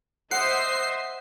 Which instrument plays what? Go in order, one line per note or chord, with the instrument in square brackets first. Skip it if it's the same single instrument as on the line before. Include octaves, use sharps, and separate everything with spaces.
[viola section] C5 D#5 E5 [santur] F#5 [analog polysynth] C7